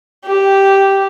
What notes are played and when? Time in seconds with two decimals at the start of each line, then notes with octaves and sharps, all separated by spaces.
0.25 G4